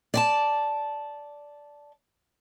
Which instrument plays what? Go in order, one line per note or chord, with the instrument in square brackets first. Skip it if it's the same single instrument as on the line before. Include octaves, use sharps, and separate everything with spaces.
[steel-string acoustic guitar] D5 G#5 A5